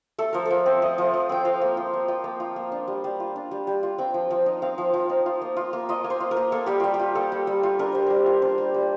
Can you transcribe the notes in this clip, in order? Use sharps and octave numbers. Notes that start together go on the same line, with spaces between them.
A3 A4
F3 A#4
F3 A4
C4
A3 D#5
F3
F3
C4 G5
F4 F5
A#3
F4
A#3
F4 G5
A#3
F4
A#3
D4
G3
G3
F4
D4
G3
G3
F4
C4 G5
F3
F3
D#4
C4 F5
F3
F3
D#4
F4
A#3
F4
A#3
F4 D#5
A#3
C5
F4
A#4
A#3
A#3 A4
G3 G4
G3 F4
G4
F4
A#3 A4
G3
G3
F4
D4 A#4
G3 C5
G3 A#4
F4
D4 C5
G3
G3